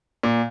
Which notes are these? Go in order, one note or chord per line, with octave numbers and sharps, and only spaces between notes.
A#2